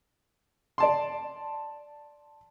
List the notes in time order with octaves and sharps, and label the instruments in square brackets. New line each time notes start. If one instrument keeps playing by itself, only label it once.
[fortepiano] D5 A5 C6